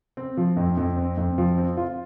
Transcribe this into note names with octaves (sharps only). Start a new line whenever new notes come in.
C4
F3
F2
F2
C4
F2
F3
C4
F4